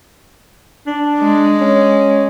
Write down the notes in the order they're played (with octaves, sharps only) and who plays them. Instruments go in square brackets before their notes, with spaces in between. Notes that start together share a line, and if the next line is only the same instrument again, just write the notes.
[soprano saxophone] D4
[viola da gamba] G#3
[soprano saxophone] C#4